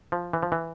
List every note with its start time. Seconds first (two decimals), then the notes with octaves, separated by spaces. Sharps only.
0.12 F3
0.33 E3
0.43 F3
0.52 E3